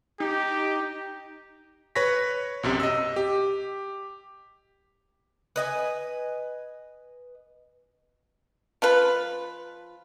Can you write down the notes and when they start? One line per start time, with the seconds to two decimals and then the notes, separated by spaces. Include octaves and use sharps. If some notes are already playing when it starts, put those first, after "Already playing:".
0.20 D#4 G4
1.95 B4 C#5 C#6 A#6 B6
2.63 B1 F#2 C3
2.80 D#5 E6
3.16 G4
5.56 B4 D#5 G#5
8.82 F3 F4 B4